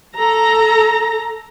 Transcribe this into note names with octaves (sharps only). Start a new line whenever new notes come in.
A4 A#5